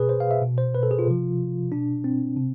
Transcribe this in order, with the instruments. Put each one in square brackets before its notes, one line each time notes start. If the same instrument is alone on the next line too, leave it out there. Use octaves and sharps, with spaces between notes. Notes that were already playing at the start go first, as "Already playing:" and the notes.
Already playing: [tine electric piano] B2 G#4 B4
C5
F5
E5
B2
C5
B4
A4
G#4
F4
C3 F3
B2 D4
C4
C3